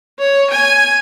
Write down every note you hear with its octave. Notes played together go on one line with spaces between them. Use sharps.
C#5
G#5